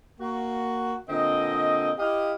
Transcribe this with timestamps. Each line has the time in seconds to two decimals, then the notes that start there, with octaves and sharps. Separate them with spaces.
0.20 A#3 F#4
1.09 A#2 D3 C4 D#5
1.98 E4 G4 D#5 F5